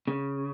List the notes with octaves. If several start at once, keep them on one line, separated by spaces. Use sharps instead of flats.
C#3